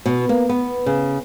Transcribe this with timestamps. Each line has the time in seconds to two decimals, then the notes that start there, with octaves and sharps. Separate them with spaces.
0.06 B2
0.29 A#3
0.49 B3
0.86 C#3